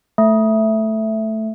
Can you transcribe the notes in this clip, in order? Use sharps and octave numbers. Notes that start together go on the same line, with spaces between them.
A3